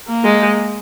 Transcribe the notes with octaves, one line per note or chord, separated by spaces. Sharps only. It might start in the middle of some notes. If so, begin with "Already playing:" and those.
A#3
G#3